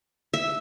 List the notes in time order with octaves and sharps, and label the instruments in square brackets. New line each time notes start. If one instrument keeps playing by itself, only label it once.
[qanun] E5